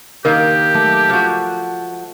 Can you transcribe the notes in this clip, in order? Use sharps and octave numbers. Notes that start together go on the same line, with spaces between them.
D#3 A#3 G4 A#4
A3
F3 F#4